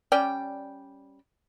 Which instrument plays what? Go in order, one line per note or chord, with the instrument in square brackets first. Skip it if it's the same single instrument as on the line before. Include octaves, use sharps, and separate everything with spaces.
[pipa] G3 C#4 D5 G5